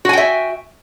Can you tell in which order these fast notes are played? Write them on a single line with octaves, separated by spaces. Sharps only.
F#4 G#5 G5 E5